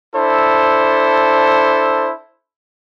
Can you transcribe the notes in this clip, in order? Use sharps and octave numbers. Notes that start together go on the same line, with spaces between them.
D4 E4 A4 C5